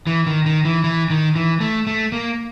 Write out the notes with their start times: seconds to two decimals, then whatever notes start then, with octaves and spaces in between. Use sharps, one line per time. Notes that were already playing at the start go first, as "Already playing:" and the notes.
0.07 E3
0.27 D#3
0.46 D#3
0.65 E3
0.84 E3
1.10 D#3
1.36 E3
1.61 A3
1.87 A3
2.12 A#3